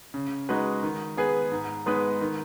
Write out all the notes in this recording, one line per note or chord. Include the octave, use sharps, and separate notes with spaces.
C#3
G#3 D#4 F#4 B4
D#3
B3 G#4 B4
G#2
G#3 B3 D#4 B4
D#3